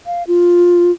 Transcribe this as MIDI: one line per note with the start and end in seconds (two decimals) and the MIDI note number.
0.06 0.23 77
0.28 0.91 65